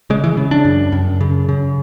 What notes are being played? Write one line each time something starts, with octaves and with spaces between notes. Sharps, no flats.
C#3 G#3
E3
C#3
D4
F#2
F#2
C#3
C#3